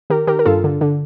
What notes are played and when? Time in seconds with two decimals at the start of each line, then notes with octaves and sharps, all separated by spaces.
0.10 D#3 G4 A#4
0.27 D#3 G4 A#4
0.39 A#4
0.46 G2 F4 A4
0.64 D3
0.81 D3